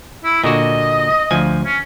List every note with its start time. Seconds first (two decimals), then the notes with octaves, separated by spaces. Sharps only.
0.24 E4
0.44 A#2 D3 F#4 D#5
1.31 D2 F3 G#5
1.65 C#4